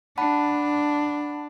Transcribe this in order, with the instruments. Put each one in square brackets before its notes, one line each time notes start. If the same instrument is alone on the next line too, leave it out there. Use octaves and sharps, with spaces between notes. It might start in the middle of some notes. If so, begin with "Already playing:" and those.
[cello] D4 [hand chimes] F#5 A5 B5